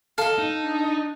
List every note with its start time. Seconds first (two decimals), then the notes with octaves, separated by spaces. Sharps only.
0.18 A4 D#5 F5
0.38 D#4
0.63 D4